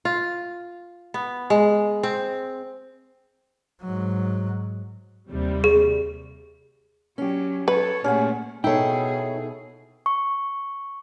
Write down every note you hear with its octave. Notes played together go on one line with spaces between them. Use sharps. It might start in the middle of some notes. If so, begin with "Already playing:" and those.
F4
B3
G#3
C4
G#2 F#3
D#2 C3 G3
G#4
F#3 C#4 G4
F#3 G4 A4 B4 C#5
A#2 A3 C#4 G4 G#4 F#5
B2 D#4 E4 G#4 A4 C#5 G5
C#6